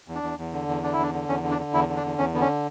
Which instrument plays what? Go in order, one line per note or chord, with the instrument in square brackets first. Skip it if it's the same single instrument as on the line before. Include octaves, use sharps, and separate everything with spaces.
[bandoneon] E2
D4
E2
E2
D3
E2
D3 D4
E4
E2 D4
D3
E2 C#4
D3
D4
D3
E2 E4
D3
D4
E2
E2 C#4
D3 B3
C#4